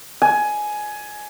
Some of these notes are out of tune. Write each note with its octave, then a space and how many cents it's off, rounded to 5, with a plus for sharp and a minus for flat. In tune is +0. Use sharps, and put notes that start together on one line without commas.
G#5 +15